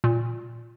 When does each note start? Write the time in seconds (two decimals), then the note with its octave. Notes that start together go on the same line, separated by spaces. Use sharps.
0.04 A#2